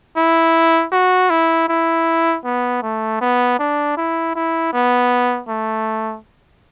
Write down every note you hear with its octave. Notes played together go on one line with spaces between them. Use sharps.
E4
F#4
E4
E4
B3
A3
B3
D4
E4
E4
B3
A3